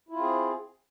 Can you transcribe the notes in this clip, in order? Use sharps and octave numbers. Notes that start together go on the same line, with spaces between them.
C4 E4 F4 G#4